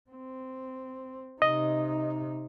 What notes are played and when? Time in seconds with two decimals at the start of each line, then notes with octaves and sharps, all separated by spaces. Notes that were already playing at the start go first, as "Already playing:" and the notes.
0.10 C4
1.42 C3 D#4 D#5